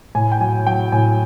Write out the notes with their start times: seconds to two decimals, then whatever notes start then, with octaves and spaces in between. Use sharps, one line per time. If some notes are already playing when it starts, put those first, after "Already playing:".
0.15 A2 G#5
0.32 G5
0.40 F#3 G#5
0.67 F#3 G5
0.92 A2 G#5